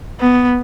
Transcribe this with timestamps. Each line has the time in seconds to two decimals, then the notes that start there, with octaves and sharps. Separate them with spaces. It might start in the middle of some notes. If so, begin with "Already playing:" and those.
0.20 B3